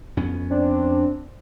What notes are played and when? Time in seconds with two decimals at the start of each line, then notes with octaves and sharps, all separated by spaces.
0.17 F2 B3 C#4
0.50 C4 D4